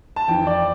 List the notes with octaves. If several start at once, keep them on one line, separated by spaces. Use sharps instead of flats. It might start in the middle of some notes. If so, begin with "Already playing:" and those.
A5
F2 E3 G5
D5